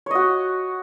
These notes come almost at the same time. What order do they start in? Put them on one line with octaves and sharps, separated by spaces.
C#5 D#5 F#4